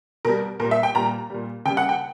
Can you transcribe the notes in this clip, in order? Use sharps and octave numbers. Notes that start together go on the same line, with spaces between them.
B2 G3 A#4
A#2 G3 A#4
E5
G5
A#2 G3 A#5
A#2 G3
C#3 G3 G5
F#5
G5